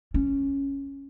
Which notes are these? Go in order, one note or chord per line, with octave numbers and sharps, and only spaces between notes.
C#4